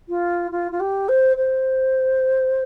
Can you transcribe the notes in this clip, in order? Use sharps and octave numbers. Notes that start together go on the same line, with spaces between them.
F4
F4
F4
G4
C5
C5